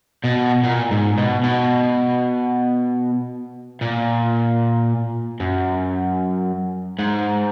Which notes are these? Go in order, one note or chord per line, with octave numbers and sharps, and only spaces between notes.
B2
A#2
G#2
B2
B2
A#2
F#2
G#2